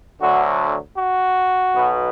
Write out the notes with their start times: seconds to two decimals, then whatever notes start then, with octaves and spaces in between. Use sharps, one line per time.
0.19 D2 D3 F#3 F#4
0.96 F#4
1.74 B1 B2 B3